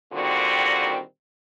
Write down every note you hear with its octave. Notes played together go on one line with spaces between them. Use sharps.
A#2 D3 D#3 G3 C4 F#4